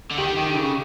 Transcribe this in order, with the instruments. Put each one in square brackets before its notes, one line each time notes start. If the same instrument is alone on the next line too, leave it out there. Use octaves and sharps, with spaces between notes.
[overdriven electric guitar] D3
[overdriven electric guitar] D#3 [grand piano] G4
[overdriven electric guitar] D#3
D3
C#3